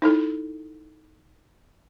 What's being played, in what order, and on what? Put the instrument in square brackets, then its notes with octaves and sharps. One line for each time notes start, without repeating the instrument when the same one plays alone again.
[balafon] D#4 E4 A4